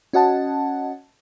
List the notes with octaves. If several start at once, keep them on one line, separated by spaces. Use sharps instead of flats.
C#4 F#4 D#5 F#5 A5